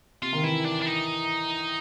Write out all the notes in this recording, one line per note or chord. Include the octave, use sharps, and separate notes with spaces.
C3 F4
D#3
E3 E4
D4
D4
D#4